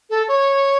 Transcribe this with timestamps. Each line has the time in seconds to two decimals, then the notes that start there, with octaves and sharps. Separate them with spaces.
0.10 A4
0.28 C#5